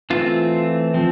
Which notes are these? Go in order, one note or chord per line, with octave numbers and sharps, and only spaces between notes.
E3 A3 C4 F4
F3 C4